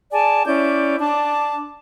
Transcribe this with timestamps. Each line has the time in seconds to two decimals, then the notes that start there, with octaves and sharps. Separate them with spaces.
0.12 G#4 D5 G#5 A5
0.46 C#4 E4 D5 G6
0.99 D4 A5 D6